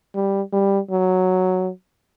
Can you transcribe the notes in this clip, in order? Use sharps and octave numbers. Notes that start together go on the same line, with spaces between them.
G3
G3
F#3